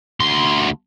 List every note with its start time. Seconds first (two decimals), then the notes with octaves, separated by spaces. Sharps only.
0.20 D2 C6